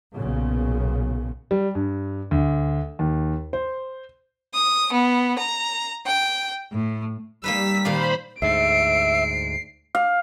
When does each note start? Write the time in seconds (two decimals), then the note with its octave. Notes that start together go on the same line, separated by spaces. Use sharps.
0.15 B1 A#2 C#3
1.51 G3
1.75 G2
2.31 D2
2.99 D#2
3.53 C5
4.54 D#6
4.93 B3
5.38 A#5
6.06 G5
6.72 A2
7.44 G3 A#3 D#4 B4 E6 B6
7.85 A#2 D#3 C5 D5 F5 B5
8.42 D2 G#2 E5 C7 D7
9.95 F5